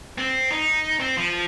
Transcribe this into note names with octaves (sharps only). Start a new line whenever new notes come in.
C4
D#4
C4
F3